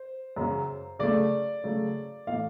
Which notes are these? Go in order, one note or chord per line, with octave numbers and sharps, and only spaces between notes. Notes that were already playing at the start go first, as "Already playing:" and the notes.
Already playing: C5
F#2 C#3 F#3
C#3 F#3 A3 D5
C#3 F#3 A3
A2 E3 A3 F5